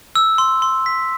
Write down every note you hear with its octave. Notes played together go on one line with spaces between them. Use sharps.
E6
C6
C6
B6